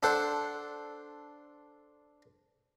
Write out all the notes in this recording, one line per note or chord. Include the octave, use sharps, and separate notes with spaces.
D4 A4 C5 F#5